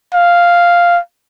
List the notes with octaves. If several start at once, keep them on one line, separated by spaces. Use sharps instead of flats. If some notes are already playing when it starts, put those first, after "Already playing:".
F5